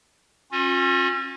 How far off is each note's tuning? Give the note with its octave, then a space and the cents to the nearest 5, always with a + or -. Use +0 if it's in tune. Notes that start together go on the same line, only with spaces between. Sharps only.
C#4 -30 F4 +40